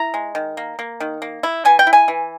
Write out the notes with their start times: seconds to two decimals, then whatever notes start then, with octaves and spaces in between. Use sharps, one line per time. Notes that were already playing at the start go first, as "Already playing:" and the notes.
Already playing: E4 A#5
0.14 G#3
0.35 D#3
0.57 A#3
0.79 A#3
1.00 D#3
1.22 A#3
1.43 E4
1.65 E3 G#5
1.79 G5
1.87 E4
1.93 G#5
2.08 E3